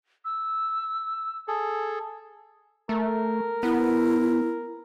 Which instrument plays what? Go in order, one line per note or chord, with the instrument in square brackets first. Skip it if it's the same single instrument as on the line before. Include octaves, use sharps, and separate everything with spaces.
[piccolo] E6
[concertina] G#4 A4
[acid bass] A3 [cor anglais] A#4
[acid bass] B3 [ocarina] E4